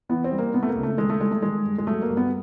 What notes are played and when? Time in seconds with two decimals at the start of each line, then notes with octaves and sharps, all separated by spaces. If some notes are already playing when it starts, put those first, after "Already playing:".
0.09 E3 B3
0.24 C4
0.31 G3
0.38 A#3
0.53 C3 B3
0.63 A3
0.69 A#3
0.75 C#2
0.83 A3
0.98 D#3 G#3
1.10 A3
1.20 G3 G#3
1.31 A3
1.42 D#3 G#3
1.65 G2
1.78 G#3
1.87 F#3 A3
2.02 A#3
2.10 G2
2.17 B3